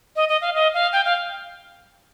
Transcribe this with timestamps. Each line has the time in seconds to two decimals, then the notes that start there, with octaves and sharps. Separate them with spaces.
0.16 D#5
0.29 D#5
0.41 F5
0.55 D#5
0.74 F5
0.93 G5
1.05 F5